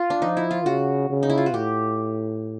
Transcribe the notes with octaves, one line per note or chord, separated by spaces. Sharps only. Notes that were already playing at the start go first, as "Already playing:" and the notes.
Already playing: F4
D4
F3 D#4
E4
F4
C#3 F#4
C#3
D#4
E4
F4
F#4
A2 G4